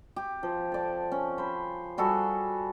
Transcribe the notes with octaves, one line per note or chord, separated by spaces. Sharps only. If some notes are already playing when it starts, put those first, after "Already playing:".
G4
F3
A4 D5
C#4
C5 B5
G3 F#4 G#4 A4